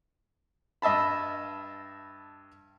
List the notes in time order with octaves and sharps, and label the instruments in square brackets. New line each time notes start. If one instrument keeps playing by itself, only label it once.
[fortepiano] G2 D#5 E5 A5 B5